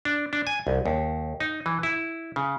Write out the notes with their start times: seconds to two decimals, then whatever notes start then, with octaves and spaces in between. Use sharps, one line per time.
0.05 D4
0.33 D4
0.47 G#5
0.67 C2
0.86 D#2
1.40 D#4
1.66 E3
1.83 E4
2.36 C#3